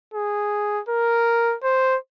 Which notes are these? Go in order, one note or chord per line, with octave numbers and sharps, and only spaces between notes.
G#4
A#4
C5